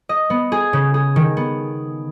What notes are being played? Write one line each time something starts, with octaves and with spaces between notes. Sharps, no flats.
D#5
B3
G#4
C#3
G#4
D#3
B3